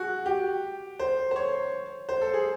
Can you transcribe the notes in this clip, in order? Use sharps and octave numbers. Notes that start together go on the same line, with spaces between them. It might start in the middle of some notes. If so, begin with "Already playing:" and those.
Already playing: F#4 G#4
G4
C5
C5
C#5
C5
A4
G#4